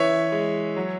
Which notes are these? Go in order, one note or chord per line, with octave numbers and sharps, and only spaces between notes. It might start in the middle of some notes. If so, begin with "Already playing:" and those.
Already playing: E3 C#4 C#5 E5
G#3
F#3